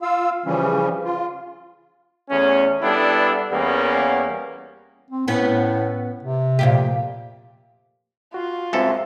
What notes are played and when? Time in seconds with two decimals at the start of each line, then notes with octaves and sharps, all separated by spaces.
0.02 F4 F5 E6
0.46 C#3 E3 F3 G3 C#4
1.05 F4
2.29 E2 A3 C#4
2.82 G3 B3 D4 E4 A4
3.51 E2 G3 A#3 B3 C#4
5.10 C4
5.28 A2 B3 C#4
6.23 C3
6.59 F2 A#2 G4
8.34 F4 F#4
8.73 C#2 F#2 G#3 C4 A4 E5